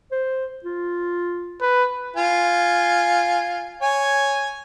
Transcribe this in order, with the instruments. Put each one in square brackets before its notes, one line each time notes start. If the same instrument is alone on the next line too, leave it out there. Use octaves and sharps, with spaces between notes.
[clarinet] C5
F4
[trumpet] B4
[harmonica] F4 G#5
C#5 G#5